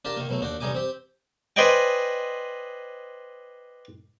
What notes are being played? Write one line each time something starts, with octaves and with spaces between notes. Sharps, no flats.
D4 F4 G4 A#4 A5
D#3 A#3
B2 F#3 A3
D#2 D4 F#4 G5
A1 D3 G3 D#4 G#5 D6
C4 G4
B4 C5 D5 D#5 G5 G#5